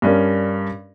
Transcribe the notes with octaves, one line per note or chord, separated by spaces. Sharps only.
G2 C#4 D4 A#4